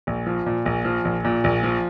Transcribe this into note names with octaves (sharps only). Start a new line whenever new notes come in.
A#1
F3
A#2
A#1
F3
A#1
A#2
A#1
F3